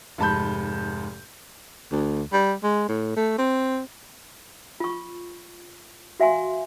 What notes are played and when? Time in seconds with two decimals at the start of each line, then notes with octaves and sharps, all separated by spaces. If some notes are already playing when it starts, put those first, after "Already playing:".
0.18 F1 G#2 A5 B5 G6
1.92 D2
2.33 G3
2.63 G#3
2.89 A2
3.16 A3
3.38 C4
4.80 F4 C#6
6.20 F#4 E5 F5 G#5 C6